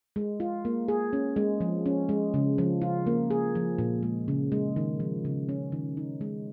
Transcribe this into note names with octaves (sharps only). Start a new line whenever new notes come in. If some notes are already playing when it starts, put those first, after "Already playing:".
G#3
F4
A#3
G#4
C#4
G#3
F3
C#4
G#3
C#3
F3
F4
A#3
G#4
F3
A#2
G#3
C#3
G#3
D#3
F3
C#3
C#4
D#3
D#4
G#3